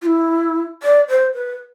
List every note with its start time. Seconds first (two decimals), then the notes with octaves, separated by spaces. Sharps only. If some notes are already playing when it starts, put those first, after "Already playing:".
0.02 F4
0.06 E4
0.83 D5
1.08 C5
1.34 B4